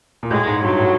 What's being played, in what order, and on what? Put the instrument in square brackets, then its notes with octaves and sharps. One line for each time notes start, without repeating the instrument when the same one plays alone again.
[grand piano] A#2
[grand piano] A2 [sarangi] G#3
[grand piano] G#2
[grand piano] G2 [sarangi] F#3
[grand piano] A2